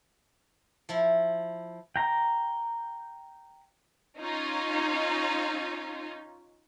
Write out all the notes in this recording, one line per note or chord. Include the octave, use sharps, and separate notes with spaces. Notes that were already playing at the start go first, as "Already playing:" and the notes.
F3 E4
G5 A#5
C#4 D#4 F4